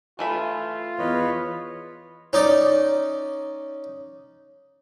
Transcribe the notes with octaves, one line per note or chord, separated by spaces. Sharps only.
E3 A3 F4 B5
E2 B4 C#5 D#5
C#4 D#4 D5